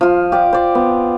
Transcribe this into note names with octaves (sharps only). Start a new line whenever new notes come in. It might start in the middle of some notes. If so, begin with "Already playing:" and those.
F3 F4
G4 D5
C5 D5
B3